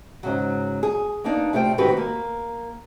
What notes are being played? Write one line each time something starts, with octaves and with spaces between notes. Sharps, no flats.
G#2 C#3 F#3
G#4
A#3 B3 D4 D#4
C3 A3 C4 F4 C5 G5
G#2 D#3 C4 F#4 G4 B4
A#3